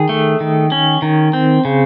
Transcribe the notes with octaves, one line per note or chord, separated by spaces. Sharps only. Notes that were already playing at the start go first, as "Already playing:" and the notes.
Already playing: D#3 G#4
A3
D#3
C#4
D#3
C4
C#3